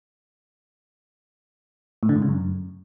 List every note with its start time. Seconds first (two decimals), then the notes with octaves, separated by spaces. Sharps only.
2.03 A2
2.09 D3
2.16 G#2
2.22 C#3
2.29 F#2